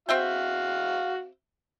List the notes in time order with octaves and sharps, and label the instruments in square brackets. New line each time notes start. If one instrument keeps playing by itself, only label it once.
[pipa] C4 E5 G5 [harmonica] F#4 F5